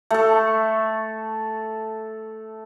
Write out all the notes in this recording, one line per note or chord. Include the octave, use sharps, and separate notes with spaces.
A3 A4